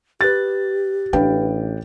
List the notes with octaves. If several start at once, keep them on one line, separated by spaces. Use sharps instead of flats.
G4 B4 F#6 A6
A1 D4 B4 F5 G5